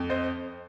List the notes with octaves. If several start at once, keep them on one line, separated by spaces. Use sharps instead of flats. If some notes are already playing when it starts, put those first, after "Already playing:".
Already playing: F2
C5 D#5